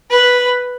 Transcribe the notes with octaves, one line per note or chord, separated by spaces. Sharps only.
B4